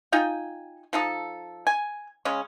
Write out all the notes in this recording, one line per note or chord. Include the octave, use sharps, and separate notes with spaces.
D#4 F4 G5 G#5
F3 D#4 A4
G#5
C#3 G#3 C#4